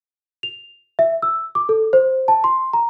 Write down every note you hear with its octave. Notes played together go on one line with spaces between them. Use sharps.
F7
E5
E6
D6
A4
C5
A5
C6
A#5